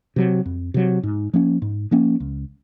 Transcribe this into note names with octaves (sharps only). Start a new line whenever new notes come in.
C3 F#3
F2
C3 F#3
G#2
F3 A#3 C#4
G#2
F3 A#3 C#4
C#2